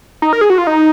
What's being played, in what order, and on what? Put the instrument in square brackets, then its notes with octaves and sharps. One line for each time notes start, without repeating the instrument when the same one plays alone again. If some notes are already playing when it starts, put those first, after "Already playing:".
[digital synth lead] D#4
A#4
G#4
F#4
F4
D#4